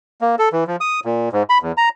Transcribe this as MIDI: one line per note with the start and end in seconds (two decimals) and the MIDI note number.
0.21 0.35 58
0.39 0.49 69
0.53 0.64 52
0.67 0.76 53
0.81 1.00 87
1.05 1.29 46
1.33 1.43 44
1.50 1.58 83
1.62 1.72 40
1.77 1.89 82